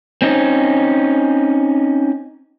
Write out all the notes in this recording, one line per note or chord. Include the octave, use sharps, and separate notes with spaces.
C4 C#4 D#4